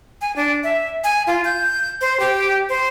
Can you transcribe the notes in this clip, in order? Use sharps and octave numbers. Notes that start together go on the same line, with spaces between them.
G#5
D4
E5
G#5
F4
G6
C5
G4
C5